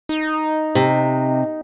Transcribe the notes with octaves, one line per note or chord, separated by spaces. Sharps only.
D#4
C3